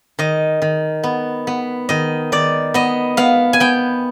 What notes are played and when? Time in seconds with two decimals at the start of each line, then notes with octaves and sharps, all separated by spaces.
0.19 D#3 D#5
0.62 D#3
1.04 B3
1.47 B3
1.89 D#3 D#5
2.32 D#3 D5
2.74 B3 D#5
3.17 B3 F5
3.53 G#5
3.60 B3 G5